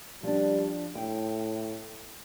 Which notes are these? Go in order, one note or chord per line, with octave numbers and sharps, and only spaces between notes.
F3 G3 D4
A2 G5